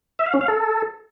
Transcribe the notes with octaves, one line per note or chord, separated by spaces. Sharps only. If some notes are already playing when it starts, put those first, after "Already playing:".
E5
F5
C#4
F5
A4